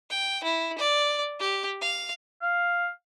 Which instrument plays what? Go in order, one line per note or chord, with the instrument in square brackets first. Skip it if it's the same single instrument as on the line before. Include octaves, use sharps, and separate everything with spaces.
[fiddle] G5
E4
D5
G4
F5
[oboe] F5